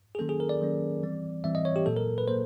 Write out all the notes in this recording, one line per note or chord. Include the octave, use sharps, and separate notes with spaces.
G#4
D#3 F#3 A#3 C#4 A4
G#4
A#4
D5
D#3 F#3 A#3 C#4
E3 G3 C4
E3 G3 C4 E5
D#5
C#5
G4
A#2 F#3 A#3 A4
A#4
B4
A#3 C5